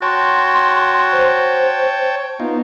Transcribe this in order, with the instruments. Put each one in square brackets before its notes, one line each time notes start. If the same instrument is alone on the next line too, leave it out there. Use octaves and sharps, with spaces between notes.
[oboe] F#4 [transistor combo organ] C#5 G5 A5 [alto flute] C6
[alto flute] C5
[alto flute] B3 [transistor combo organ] D#4 F4